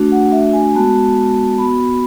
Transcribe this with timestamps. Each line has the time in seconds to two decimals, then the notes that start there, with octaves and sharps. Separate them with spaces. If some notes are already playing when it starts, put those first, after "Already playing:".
Already playing: A3 D4 F#4
0.12 F#5
0.32 E5
0.53 G#5
0.74 G#3 B3 F#4 A5
1.58 B3 F#4 B5